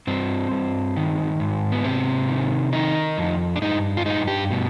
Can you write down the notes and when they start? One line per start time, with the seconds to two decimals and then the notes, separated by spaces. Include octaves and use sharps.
0.07 G2 C4
0.51 G2
0.97 D#3
1.40 G#2
1.72 B3
1.84 C3 C4
2.29 D#3
2.73 D#3 D#4
3.18 F2
3.56 D4
3.62 G2 D#4
3.97 F4
4.06 G2 D#4
4.28 G4
4.51 B2